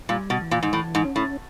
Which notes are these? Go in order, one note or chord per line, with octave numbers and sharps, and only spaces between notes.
A#2 G3
B2
E3
A#2
G#2
A2 E3
G#2
C#4
A2